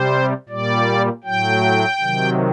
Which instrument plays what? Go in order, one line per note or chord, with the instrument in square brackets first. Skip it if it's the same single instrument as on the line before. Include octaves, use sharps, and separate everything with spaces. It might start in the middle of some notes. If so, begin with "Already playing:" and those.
Already playing: [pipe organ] C3 G3 C5
A#2 G3 D5
A2 F#3 G5
C3 D#3 F#3